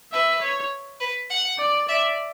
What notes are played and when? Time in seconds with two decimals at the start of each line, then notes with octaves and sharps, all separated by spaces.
0.12 B4 E5
0.42 C#5
1.00 B4
1.30 F#5
1.59 D5
1.89 D5 E5